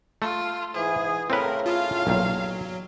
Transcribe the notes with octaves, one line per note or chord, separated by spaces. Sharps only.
A3 F4
G#2 E3 G#4
A2 C#3 C4 A#4 B4
F4 F5
B1 A#2 F#3